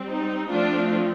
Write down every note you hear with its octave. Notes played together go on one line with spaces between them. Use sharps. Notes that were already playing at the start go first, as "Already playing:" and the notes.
Already playing: G3 C4
D#4
F3 A3 C4 D4 F4